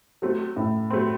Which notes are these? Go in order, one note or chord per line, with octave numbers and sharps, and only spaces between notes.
F#3 A3 C4
A2
F#3 A3 C4